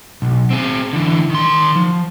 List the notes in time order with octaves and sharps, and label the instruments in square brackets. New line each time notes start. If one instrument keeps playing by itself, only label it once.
[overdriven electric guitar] B1
C4 G#4
D3 E3
D#3 C6
F3